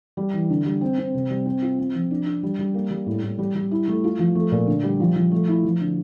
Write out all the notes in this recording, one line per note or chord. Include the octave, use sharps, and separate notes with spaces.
G3
E3
D3
G3
C4
C4
C3
G3
C4
F4
C4
F3
D4
D4
G3
G3
A#3
G3
A2
A2
G3
G3
E4
A3
F4
F3
A3
A#2
D3
G3
F3
F3
A3
E4
F3
D3